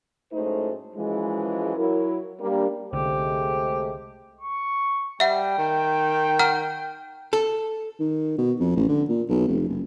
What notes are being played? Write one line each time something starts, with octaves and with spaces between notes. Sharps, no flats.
F#2 A2 G#3 A3 D#4 C5
F#2 E3 F3 G#3
F#3 E4 A#4
G3 A#3 D4
C2 D3 G#3 A3 G4 C5
C#6
G3 E5 F#5 G5
D#3
F#5 A#5 F6
A4
D#3
B2
F2
A1
D3
A#2
B1
F1
F#1